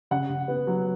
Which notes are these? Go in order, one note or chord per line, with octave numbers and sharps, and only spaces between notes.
C#3 F#5
C#3
B3
F#3